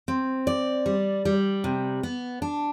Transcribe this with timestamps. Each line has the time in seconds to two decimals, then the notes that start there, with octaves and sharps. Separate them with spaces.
0.08 C4
0.47 D5
0.86 G3
1.25 G3
1.64 C3
2.03 B3
2.42 D4